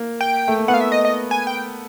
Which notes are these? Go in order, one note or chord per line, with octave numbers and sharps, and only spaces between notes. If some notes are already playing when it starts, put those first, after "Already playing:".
Already playing: A#3
G5
A3
A#3
B3 F#5
F5
E5
D#5
D#5
G#5
G5